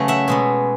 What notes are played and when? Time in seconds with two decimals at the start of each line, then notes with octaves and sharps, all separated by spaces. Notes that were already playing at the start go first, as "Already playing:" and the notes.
Already playing: C#3 F#3 A3 B3
0.08 E5 F#5
0.28 B2 G#3 B3